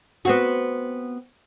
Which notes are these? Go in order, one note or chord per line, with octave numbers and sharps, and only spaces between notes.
B3 C4 F#4